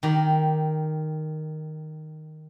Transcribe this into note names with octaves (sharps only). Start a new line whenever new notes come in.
D#3 G4